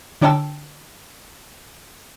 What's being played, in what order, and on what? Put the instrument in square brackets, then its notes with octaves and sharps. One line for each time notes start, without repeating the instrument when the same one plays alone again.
[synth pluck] D3 D4 C#5 G5 A5 E6